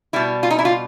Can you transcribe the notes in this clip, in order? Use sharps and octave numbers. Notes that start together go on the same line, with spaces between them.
B2 G3 E4
F4
D#4
E4
F4